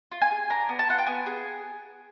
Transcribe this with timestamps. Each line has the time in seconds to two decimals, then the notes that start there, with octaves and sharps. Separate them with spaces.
0.12 F4
0.22 G#5
0.31 G#4
0.50 D4 A#5
0.69 B3
0.79 A5
0.89 F4 F#5
0.98 G5
1.07 B3 G#5
1.26 G#4